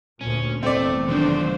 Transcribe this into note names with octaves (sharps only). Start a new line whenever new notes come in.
D2 A#2 C#4
F1 E2 A3 C4 D5
D#3 F#3 A3 D4 C5